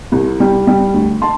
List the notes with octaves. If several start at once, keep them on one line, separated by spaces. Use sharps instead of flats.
C2
G3
G3
D2
A5 C6